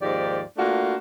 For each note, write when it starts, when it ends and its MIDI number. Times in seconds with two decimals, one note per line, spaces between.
0.01 0.41 39
0.01 0.41 44
0.01 0.41 53
0.01 0.41 67
0.01 0.41 74
0.57 0.95 57
0.57 0.95 58
0.57 0.95 62
0.57 0.95 65
0.57 0.95 66